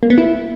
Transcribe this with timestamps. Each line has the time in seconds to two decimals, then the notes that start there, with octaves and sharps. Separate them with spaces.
0.03 A#3
0.10 B3
0.18 E4